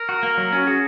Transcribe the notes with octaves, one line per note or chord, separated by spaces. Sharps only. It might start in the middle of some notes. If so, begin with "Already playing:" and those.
Already playing: A#4
F#4
A#3
F#3
C#4 F#4
F#4 G#4